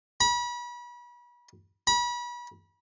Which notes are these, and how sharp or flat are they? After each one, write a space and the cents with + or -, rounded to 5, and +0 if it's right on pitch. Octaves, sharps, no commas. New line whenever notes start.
B5 -35
B5 -35